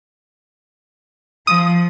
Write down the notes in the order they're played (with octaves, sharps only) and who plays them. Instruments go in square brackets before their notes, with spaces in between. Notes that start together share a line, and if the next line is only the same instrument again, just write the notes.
[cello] F3 [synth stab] D#6